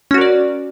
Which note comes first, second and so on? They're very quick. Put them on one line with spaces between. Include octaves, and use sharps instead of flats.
C#4 F#4 A#4 D5